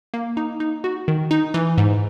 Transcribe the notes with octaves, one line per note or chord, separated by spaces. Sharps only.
A#3
D#4
D#4
F#4
D#3
D#4
E3
G#2